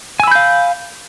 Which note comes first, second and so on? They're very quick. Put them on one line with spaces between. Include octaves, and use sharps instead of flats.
G#5 E6 B5 G6 F5